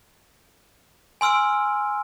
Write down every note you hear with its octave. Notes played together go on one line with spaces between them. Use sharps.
G#5 C6 E6 F6 D7